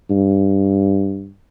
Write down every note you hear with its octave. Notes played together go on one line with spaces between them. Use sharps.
G2